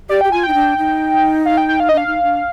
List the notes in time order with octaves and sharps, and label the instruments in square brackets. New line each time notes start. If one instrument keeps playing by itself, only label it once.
[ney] G4 [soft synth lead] D5
[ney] G4 [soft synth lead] G5
[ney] F4 [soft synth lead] G#5
[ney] D#4 [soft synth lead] G5
[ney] D4
D#4
[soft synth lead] F5
G5
G5
F5
[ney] D4 [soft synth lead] D#5
[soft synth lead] F5
[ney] D#4
D4